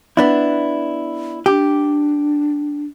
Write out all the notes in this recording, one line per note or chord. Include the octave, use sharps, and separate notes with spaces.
B3 D4 E4
D4 G4